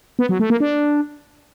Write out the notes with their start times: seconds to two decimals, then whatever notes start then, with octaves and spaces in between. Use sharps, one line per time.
0.19 B3
0.29 F#3
0.40 A3
0.50 A#3
0.60 D4